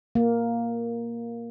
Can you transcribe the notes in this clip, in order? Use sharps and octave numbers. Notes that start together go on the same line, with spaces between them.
A#3